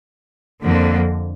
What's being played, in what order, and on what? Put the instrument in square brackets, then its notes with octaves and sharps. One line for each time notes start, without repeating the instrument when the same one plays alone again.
[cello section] F2 D3 F3 A#3